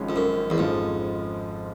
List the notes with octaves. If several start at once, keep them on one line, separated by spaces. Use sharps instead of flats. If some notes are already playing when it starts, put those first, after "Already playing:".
Already playing: G#1 G#2 F3 G#3 C#4
F2
F#2
E2
G#1 F2 G#2 F3 G#3 C#4